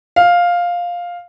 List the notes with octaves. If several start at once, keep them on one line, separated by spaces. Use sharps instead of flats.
F5